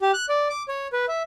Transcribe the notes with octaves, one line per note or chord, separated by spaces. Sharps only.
G4
F#6
D5
D6
C#5
B4
E5